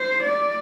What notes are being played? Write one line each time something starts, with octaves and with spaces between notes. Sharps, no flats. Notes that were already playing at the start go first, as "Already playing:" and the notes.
Already playing: C5
D5